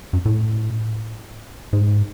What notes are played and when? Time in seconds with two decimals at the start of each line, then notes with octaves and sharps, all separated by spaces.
0.13 F#2
0.26 A2
1.73 G#2